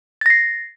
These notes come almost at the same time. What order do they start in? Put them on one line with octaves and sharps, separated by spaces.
A6 A#6 C7